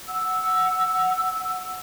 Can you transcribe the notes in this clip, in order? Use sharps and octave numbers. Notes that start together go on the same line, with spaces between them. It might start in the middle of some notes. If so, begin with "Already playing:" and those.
F#5 E6